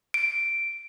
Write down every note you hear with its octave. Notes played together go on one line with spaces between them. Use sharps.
D7